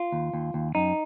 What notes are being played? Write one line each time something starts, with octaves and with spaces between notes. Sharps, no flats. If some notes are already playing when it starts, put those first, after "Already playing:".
Already playing: F4
D#2
D#2
D#2
F#2 D#4